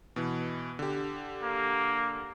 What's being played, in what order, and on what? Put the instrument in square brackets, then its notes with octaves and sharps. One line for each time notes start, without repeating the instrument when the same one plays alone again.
[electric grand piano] B2 E3
D3 G4
[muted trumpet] A#3